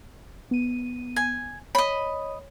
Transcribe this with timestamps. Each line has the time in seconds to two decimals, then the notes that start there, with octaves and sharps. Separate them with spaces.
0.51 B3 D#7
1.16 G#5
1.75 C#5 D#5 B5